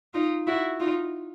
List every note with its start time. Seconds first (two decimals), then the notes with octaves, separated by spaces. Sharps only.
0.14 D#4 F4
0.47 E4 F#4
0.80 D#4 F4